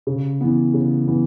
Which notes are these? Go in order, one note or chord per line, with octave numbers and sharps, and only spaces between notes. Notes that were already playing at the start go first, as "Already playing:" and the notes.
C#3
E3 B3
C#3
E3 B3